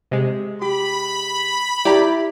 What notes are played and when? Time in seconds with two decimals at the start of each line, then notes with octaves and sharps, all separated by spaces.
0.11 C3 G#3
0.62 G4 B5
1.85 E4 G4 D5 A#5